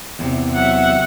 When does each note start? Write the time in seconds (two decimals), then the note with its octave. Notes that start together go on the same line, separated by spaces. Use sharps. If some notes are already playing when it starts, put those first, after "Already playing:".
0.19 E2 A2 C3
0.54 F#3 E5 F#5